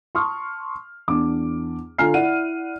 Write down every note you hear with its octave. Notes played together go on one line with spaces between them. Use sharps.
A5 C6 C#6 D#6 F6
E2 D4 D6
D3 F4 G#5 A#5 F6 C7
E4 D5 F#5 D#7